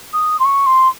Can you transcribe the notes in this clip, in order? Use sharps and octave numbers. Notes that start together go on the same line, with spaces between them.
D#6
C6
C#6
C6